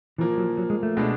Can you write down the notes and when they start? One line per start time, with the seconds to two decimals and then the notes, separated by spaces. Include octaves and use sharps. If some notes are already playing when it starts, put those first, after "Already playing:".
0.18 A#2 E3 F3 A#3
0.37 F#3
0.57 F#3
0.70 G#3
0.83 A3
0.97 B2 G#3 B3 D4